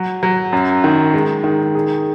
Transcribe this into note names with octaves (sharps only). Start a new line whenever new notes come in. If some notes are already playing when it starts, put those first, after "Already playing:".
Already playing: F#3
F#3
F#2
D#3
G#3
D#3
G#4